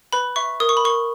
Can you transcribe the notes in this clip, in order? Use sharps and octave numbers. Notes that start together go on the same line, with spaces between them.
B4 B5
E5 C#6
A#4 D#6
C#6
B5
A#4 C#6